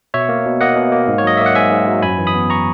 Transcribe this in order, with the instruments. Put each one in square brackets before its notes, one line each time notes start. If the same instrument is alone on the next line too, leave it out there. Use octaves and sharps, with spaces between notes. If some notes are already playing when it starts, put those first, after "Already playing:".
[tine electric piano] B2 C#5 E5
A#3
B2
A#3 D#5 F#5
B2
A#3
G#2
C#5
F#3 D#5
A#3 E5
F#5
G#2 E5 G#5
G#2
F#3
F#2 G#5 B5
E3
B5 D#6
B3
A#5 C#6